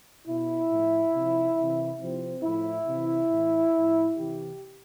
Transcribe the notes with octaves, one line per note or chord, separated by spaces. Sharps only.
B2 E4
A2 F3
C3 F3
C3 E3
C3 F3 C4
A2 F3 E4
C3 E3
A2 E3
A2 F3
C3 E3 G4